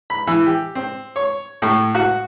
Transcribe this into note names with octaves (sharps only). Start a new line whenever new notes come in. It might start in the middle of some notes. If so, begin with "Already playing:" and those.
B5
E3
G4
C4
C#5
A2
F#4